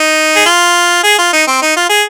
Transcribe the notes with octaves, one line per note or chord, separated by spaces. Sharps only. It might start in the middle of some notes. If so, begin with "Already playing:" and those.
Already playing: D#4
G#4
F4
G#4
F4
D#4
C4
D#4
F4
G#4